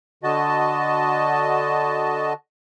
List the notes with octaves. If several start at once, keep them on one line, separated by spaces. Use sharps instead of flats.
D3 F#4 D#5 A5